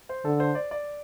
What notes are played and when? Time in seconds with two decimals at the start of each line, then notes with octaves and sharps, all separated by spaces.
0.09 C5
0.25 D3 A4
0.40 C5
0.55 D5
0.71 D5